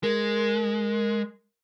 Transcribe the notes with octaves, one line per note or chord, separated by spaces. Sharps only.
G#3 A#4